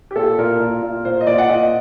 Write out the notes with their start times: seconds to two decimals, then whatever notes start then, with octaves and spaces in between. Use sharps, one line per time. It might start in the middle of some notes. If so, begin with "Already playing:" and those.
0.11 G4
0.16 A#2 A4
0.38 A#2 A#4
0.60 A#2
0.82 A#2
1.05 A#2 C5
1.21 D#5
1.27 A#2 D5
1.38 F#5
1.49 A#2 D#5